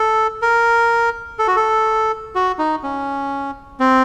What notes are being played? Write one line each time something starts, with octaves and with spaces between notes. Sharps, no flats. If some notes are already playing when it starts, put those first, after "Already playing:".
Already playing: A4
A#4
A4
F#4
A4
F#4
D#4
C#4
C4